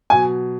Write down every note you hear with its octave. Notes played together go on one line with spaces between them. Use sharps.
B2 F#3 G#5